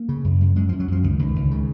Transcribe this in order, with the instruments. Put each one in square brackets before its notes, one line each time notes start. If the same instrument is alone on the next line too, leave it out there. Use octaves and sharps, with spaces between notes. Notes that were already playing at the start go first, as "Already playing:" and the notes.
Already playing: [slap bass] A#3
C#3
F#2
F#2
F#2 G#3
F#2 F3
F#3
F#2 F3
C#2 D#3
C#2
C#2
C#3